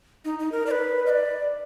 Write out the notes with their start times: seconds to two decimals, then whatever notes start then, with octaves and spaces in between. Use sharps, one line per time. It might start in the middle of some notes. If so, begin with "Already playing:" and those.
0.25 D#4
0.39 D#4
0.52 A#4
0.66 D5
0.71 B4
1.06 D#5
1.10 D5